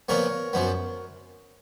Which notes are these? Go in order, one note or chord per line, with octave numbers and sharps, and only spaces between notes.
A#2 F3 B3 A#4 C#5
F#2 F3 B3